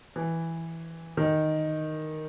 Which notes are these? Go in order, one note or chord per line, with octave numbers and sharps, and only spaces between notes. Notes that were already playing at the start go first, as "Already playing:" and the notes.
E3
D#3